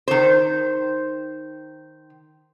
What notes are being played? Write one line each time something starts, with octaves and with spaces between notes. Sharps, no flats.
D#3 C5